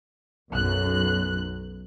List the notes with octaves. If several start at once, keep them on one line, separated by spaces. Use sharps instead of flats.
B1 F#2 F#6